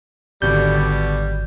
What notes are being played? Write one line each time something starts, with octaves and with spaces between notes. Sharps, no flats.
G#1 B2 D3 G3 G6